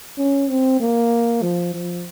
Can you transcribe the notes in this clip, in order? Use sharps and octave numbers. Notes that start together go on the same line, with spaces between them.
C#4
C4
A#3
F3
F3